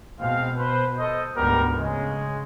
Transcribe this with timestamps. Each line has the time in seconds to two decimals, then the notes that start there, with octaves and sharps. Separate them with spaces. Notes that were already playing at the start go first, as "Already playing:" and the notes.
0.20 B2 G#3 C4 F5
0.57 B4 C5
0.98 A4 C5 D#5
1.36 D2 G#2 G3 B3 G4 A#4
1.77 C#3 G#3